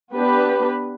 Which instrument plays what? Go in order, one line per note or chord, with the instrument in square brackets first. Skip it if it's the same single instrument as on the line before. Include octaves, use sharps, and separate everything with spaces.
[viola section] B3 D4 G4 B4